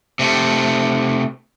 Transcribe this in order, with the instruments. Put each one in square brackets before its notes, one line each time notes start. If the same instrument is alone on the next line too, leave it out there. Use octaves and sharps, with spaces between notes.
[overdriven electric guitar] C3 A3